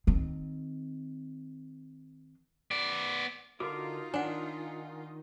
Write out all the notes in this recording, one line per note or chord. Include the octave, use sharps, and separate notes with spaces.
D#3 C4
B3 D5
D3 D#4 F4 F#4 A#4 D6
D#3 D4 F#5 G#5